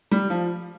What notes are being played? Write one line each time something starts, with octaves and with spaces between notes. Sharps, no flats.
G3
F3